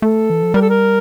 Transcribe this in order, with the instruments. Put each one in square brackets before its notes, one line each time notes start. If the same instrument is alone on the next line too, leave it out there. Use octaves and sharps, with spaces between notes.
[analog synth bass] A3 [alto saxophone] A4
[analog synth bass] E3
F3
[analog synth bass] G3 [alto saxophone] A#4
[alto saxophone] A4
A#4